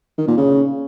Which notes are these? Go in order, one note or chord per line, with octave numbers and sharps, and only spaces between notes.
D#3
A#2
C#3